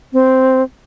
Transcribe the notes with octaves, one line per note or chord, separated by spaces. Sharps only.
C4